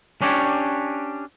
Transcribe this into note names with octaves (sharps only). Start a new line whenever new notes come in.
C#4 D4 G4 C#5